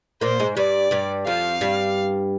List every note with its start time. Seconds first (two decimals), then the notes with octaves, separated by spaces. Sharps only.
0.21 A#2 A#3 C5
0.40 G#2 G#3
0.57 G2 G3 D5
0.91 G2 G3
1.27 F2 F3 F5
1.61 G2 G3